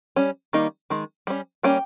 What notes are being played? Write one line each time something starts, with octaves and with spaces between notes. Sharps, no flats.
G3 C#4
D#3 G3 A#3 D#4
D#3 G#3
G3 C#4
G3 A#3 C#4 G5